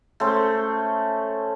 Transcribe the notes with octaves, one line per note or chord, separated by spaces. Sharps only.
A3 C#4 C5